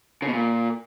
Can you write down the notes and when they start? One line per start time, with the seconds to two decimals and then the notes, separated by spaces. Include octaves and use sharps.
0.22 C#3
0.28 B2
0.33 A#2